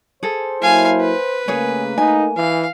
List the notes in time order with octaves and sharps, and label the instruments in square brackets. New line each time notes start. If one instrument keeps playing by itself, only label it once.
[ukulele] G#4 A4 [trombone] C5
[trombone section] F#3 A#3 E4 [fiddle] F5 G#5
[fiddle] B4
[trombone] C#3 [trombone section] A3 A#3 [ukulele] G#4 C#5 G#5
[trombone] D#4 [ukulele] G#5
[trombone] E3 [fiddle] F5